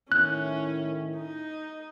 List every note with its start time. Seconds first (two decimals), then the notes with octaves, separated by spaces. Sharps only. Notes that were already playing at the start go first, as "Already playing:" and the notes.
0.12 A2 D#3 C#4 E4 F#6
1.17 D#4